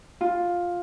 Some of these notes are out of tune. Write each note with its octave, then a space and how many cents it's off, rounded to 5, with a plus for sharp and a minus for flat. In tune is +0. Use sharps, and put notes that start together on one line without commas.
F4 +10